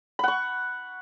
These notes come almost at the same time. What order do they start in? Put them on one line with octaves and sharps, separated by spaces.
B5 F#5 C#6